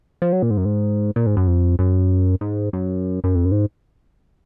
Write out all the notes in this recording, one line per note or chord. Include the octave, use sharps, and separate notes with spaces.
F3
F#3
A#2
G#2
F#2
G#2
A#2
G#2
F#2
F2
F#2
G#2
F#2
F#2
F2
F#2
G#2